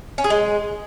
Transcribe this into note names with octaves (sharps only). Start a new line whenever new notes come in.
C#4
G#4
G#3